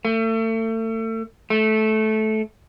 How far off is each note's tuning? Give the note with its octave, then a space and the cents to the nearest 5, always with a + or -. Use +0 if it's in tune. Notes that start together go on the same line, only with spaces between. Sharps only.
A3 +35
A3 -15